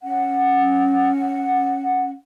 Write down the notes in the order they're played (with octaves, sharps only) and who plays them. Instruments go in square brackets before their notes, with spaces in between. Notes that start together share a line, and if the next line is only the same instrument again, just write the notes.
[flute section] C#4 F#5